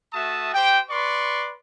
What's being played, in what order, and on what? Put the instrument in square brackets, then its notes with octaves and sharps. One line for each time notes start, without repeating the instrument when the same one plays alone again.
[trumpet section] A3 F#4 E5 A5 D#6
G4 C5 G5
B4 D5 C6 C#6